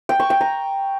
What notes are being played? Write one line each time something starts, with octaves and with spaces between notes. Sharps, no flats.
G5
C#6
G5
A#5